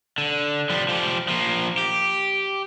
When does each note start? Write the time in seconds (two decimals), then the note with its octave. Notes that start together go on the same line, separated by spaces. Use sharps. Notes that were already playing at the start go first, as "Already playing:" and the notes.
0.18 D3
0.70 F3 G3
0.89 F3 G4
1.28 F3 A#3
1.78 G4